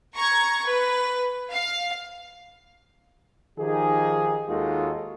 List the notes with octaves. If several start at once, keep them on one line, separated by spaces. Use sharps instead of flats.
A#5 C#6 G#6
B4
F5
D#3 F3 D#4 G4 G#4
D#2 G#3 D#4 F4 F#4 A4